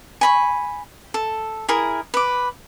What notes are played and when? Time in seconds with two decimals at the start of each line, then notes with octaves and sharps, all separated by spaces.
0.21 G#5 B5 C#6
1.14 A4
1.69 E4 G#4 A#4
2.14 B4 D6